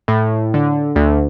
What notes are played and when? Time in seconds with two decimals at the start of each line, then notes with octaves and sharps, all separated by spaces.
0.08 A2
0.54 D3
0.96 D2